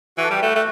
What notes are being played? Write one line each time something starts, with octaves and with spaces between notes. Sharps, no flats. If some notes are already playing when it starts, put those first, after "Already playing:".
E3 F#4
A4
G3 G4
A3 F#4
A3